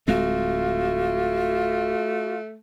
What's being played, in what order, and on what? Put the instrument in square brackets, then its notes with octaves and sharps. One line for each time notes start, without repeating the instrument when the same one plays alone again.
[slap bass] D1 G#3 C4 [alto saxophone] A3 [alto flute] F4 [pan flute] F#4